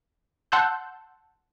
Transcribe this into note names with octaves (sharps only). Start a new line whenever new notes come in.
F#5 A5 C6 E6 F#6 G6